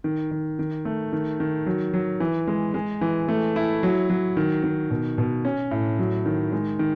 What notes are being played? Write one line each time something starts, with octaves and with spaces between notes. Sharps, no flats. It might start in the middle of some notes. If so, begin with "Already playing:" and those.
D#3
D#3
D#3
A3
D#3
D#3
F#3
F#3
E3
G#3
G#3
E3
A3
E4
F#3
F#3
D#3
D#3
B2
B2
C#4
A2
F#3
D#3
G#3
D#3